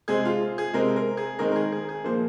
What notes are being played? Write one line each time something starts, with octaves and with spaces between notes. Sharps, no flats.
C3 G#3 C4 G#4
F4
G#4
C3 G#3 C4 A#4
A#4
G#4
D#3 G#3 C4 A#4
A#4
G#4
G#4
G#4
A#2 F3 A#3 C5